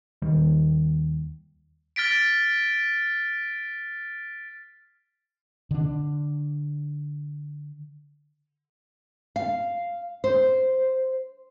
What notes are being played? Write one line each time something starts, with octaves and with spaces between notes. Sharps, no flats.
D#2 D#3 G3
F6 A6 B6 D7
D3 D4
F5
C5